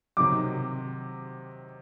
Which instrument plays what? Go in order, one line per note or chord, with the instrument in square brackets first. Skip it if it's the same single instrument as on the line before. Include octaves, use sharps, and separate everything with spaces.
[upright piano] C3 D#3 F#3 D6